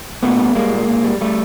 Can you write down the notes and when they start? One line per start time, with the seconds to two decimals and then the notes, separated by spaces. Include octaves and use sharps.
0.23 A#2 A3 B3
0.39 G3
0.55 G3 G#3 A#3
0.73 A#2
0.89 A#2
1.04 G3
1.21 G3 A3